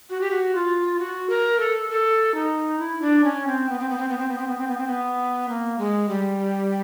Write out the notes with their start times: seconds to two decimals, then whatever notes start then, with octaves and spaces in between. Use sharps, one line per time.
0.10 F#4
0.21 G4
0.31 F#4
0.55 F4
0.99 F#4
1.29 A#4
1.60 A4
1.90 A4
2.34 D#4
2.79 E4
3.02 D4
3.24 C#4
3.47 C4
3.69 B3
3.79 C4
3.89 B3
3.98 C4
4.09 B3
4.18 C4
4.29 B3
4.38 C4
4.47 B3
4.58 C4
4.68 B3
4.78 C4
4.87 B3
5.49 A#3
5.78 G#3
6.09 G3